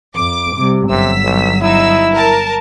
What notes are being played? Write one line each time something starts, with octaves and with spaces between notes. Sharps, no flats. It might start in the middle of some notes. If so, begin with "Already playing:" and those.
F2 D6
C3 G3
G1 C3 F#3 E6 B6
B1
D#4 E4 E6
A#4 A5